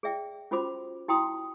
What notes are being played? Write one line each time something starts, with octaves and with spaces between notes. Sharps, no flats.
G#4 D5 E5 G5
C#4 F4 F#4 C5 B5 D6
E4 F#4 G5 A#5 C6 D#6